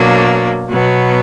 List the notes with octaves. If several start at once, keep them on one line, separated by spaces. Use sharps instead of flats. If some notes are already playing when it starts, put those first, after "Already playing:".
Already playing: B2 F#3 A#3 D4
B2 F#3 B3